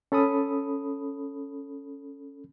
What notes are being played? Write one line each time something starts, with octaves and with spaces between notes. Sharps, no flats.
C#4 A4 B5 D#6